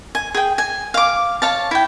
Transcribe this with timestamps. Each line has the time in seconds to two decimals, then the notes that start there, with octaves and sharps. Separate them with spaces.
0.15 G#5
0.35 G#4 G5
0.58 G#5
0.94 F5 D6
1.42 C#5 F5 A5
1.71 E4 G5